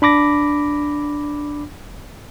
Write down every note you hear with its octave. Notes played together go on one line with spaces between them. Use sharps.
D4 B5 D6 A#6